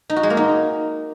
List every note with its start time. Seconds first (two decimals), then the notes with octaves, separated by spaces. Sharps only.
0.10 D#4
0.16 F#4
0.23 G#3
0.30 A#3
0.37 D#4